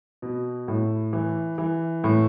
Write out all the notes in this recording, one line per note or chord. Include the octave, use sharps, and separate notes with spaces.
B2
A2
E3
E3
A2